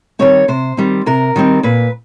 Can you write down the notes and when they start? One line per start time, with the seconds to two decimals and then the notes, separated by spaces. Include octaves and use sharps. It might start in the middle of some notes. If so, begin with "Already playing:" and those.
0.19 D#3 G3 C4 C#5
0.48 C3 C5
0.77 D#3 G3 C4
1.06 C3 A#4
1.36 D#3 G3 C4
1.63 A#2 B4